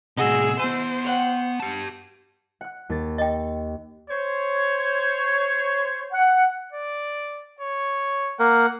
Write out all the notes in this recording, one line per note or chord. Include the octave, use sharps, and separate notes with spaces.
A2 C3 F#4 G#4 D#5 E6
B3 C5 G#5
C#5 F#5 G5
G4 A5
F#5 F#6
D#2 A6
D#5 G5
C5 C#5
F#5
D5
C#5
A#3 A#4 F#5